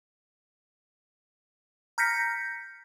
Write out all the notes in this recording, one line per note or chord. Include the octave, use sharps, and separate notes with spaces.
A#5 F6 G6 A#6 B6 C#7